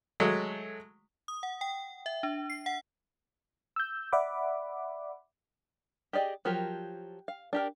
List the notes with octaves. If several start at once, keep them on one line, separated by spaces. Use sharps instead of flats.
F#3 G#3 A3
D#6
F#5
G5
E5
D4
C7
F#5
E6 G6
D5 E5 F#5 B5 D6
G4 G#4 D5 D#5
F3 F#3 F4 G4 A#4
F5
D4 G4 A#4